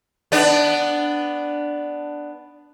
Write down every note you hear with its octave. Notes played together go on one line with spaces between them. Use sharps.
B3 D4